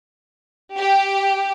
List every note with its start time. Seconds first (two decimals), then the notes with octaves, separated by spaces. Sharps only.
0.78 G4